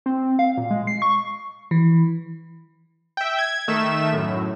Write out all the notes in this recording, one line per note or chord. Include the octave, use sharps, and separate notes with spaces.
C4
F5
A#2
G#3
C7
C#6
E3
E5 G5
G#6
D#3 A3 E5 E7
F#2 A2